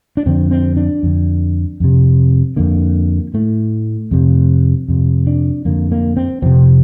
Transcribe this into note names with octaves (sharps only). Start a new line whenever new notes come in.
D4
F2 D3 C4
C4
D4
F2 D3
F2 C3
F2 D3 A#3
A2 A3
F2 C3
F2 C3
D4
F2 D3 A#3
A#3
C4
F2 C3 C4